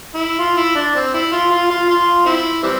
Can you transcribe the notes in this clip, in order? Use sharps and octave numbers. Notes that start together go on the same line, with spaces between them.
E4
F4
E4
D4
C4
E4
F4
F4
F4
F4
C4 E4
E3 G3 C4